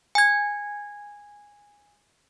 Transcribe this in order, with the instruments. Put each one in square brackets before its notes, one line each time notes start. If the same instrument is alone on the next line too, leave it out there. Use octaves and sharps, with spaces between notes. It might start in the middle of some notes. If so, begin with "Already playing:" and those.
[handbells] G#5 G#6